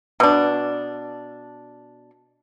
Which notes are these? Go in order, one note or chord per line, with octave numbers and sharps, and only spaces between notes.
B2 D4